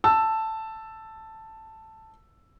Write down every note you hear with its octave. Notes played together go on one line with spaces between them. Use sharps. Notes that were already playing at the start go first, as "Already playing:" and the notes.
A5 E6